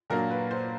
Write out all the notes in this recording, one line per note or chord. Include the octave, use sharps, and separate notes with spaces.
A#2 F#3 A#3 D4 A#4
B4
C5